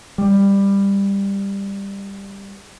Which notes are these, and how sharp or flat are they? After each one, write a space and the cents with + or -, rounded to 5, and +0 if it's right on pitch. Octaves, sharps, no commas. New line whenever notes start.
G3 +15